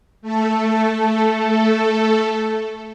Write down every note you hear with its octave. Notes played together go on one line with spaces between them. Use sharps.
A3 A4